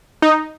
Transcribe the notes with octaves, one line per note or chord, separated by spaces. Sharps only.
D#4